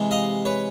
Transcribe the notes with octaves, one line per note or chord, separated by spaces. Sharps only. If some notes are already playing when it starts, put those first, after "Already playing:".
Already playing: C3 E3 G#3
D#5 F5
B4 C#5